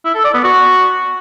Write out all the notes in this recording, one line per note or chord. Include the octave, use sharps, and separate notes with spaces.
E4
A4
D5
B3
F#4